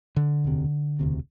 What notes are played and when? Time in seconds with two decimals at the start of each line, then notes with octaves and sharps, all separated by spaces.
0.16 D3
0.44 E1 D2 C3
0.99 E1 D2 C3